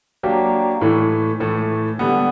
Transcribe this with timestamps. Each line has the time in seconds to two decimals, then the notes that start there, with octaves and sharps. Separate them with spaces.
0.23 F#3 A#3 D4 G4
0.81 A2 E3 A3
1.40 A2 E3 A3
1.99 D3 G3 B3